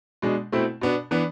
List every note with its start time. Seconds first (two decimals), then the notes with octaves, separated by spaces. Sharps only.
0.22 B2 G#3 D4
0.52 B2 A3 C4 E4
0.81 B2 B3 D4
1.11 E3 B3 D4